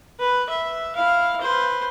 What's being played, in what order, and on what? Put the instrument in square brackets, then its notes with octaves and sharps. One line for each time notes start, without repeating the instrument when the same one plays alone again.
[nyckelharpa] B4
E5
E4 F5
B4 C5